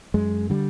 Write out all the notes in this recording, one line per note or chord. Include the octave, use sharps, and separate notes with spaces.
F#2 G#3
D3 G3